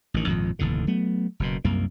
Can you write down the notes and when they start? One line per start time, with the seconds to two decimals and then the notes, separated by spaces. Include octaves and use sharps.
0.14 A1 D#3
0.27 G#1 F2 A#2
0.59 F1 D#2 A2 D3
0.87 F#3 A3 B3
1.40 F#1 F#2 B2
1.65 C2 F#2 A#3